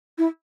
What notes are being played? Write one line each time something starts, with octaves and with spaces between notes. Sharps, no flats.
E4